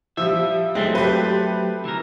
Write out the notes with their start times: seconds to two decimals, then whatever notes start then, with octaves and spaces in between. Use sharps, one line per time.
0.17 F3 G3 E5
0.75 F#3 G#3 A3 C4
0.95 G4 B4
1.85 E3 A#4